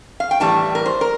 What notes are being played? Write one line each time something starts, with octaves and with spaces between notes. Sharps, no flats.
F5
G5
A2 E3 G3 A5
A#4
C5
A#4